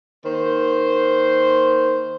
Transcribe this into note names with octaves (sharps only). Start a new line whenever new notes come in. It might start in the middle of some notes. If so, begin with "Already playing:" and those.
D#3 A#3 C5